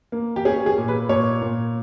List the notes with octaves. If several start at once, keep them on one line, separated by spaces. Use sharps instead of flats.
A#3
G4
C#4 G#4
G#4
A#2
B4
A#2 C#5
A#2